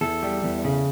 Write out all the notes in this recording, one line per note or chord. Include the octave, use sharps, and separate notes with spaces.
E2 A4
G3
E2
C#3